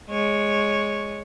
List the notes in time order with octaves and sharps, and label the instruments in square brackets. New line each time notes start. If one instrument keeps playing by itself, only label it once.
[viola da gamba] G#3 C#5